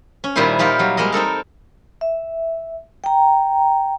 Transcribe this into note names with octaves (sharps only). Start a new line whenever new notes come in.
C#4
A#2 D#3 G3 E4 C5 G#5
A#3 D#4 F4 G4 A#4
F#3 G3
G3 G#3 A#3 A#4 D#5
C4 D#4 A4 A#4
E5
G5 A#5